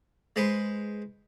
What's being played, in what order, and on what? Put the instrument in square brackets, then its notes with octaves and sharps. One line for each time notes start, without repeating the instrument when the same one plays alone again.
[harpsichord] G#3 B4 C5